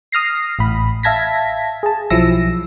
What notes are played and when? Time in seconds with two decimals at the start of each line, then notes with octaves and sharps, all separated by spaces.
0.12 D#6 F6 A#6 C7
0.59 A1 A2 B5
1.03 E5 F5 A5 G#6 A#6 B6
1.83 G#4 A5
2.10 B1 F3 F#3 E4 E6 A#6